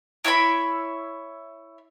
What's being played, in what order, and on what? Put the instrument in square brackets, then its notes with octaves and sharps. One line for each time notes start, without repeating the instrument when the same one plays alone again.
[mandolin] E4 C#5 E5 B5